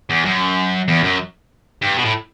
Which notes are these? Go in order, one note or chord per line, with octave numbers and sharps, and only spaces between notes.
E2
F#2
E2
F#2
G2
B2
A2